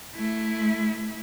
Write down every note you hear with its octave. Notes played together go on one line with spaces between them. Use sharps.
A3 E4